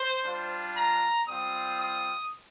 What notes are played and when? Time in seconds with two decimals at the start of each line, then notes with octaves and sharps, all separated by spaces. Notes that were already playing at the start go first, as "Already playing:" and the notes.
Already playing: C5
0.22 G3 D4 F4
0.75 A#5
1.28 G3 C4 F4 D#6
1.81 D#6